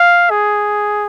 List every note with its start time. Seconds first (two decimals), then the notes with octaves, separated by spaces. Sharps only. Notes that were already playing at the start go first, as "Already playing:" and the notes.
Already playing: F5
0.30 G#4